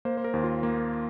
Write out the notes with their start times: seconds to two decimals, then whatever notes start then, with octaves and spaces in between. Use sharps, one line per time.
0.05 A#3 C5
0.17 C5
0.24 A#4
0.34 D#2
0.44 F4
0.63 A#3